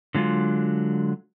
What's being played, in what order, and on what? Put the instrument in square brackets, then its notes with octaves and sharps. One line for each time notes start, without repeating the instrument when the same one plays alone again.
[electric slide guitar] D3 F#3 G#3 F4